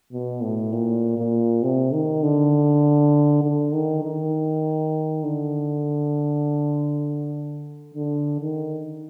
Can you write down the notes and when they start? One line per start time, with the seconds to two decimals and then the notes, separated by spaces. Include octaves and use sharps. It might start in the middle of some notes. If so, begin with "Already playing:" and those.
0.13 B2
0.43 A2
0.73 A#2
1.18 A#2
1.63 C3
1.93 D#3
2.23 D3
3.43 D3
3.73 D#3
4.03 D#3
5.24 D3
7.95 D3
8.40 D#3